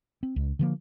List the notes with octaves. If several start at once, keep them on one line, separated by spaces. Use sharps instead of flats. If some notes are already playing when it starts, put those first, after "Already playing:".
C4
C#2
D3 F3 A#3